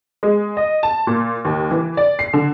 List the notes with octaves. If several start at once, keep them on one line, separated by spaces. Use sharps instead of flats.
G#3
D#5
A5
A#2
D#2
E3
D5
C7
D3